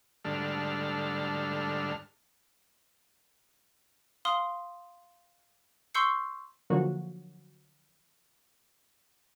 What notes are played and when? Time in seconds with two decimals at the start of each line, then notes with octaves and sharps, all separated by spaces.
0.25 D2 G#2 G3 D4 A4 F6
4.25 F5 C6 D#6 F6 G7
5.94 C6 C#6 E6 G6 C7 C#7
6.70 D3 F3 F#3 A#3 F#4